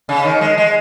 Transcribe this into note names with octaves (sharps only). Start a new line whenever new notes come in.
C#3
D#3
G#3
G#3